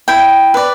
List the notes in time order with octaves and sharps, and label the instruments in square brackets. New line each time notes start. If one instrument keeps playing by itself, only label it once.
[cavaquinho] E4 G5
B4 D5